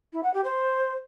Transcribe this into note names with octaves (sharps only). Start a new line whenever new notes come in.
E4
F#5
G4
C5